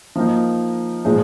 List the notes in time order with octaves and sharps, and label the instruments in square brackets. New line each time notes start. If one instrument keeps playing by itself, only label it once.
[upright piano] F3 A#3 D#4
A#2 F3 G#3 D#4